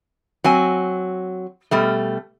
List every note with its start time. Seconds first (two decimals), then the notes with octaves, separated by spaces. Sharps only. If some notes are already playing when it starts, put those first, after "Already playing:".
0.44 F#3 C4 G#5
1.71 B2 G3 A3